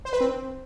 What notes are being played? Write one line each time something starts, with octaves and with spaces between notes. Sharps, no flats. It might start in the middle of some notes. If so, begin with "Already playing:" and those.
C5
B4
C4